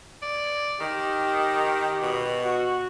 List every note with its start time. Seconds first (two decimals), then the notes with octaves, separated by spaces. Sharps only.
0.22 D5
0.80 D#3 G4
2.02 B2
2.45 F#4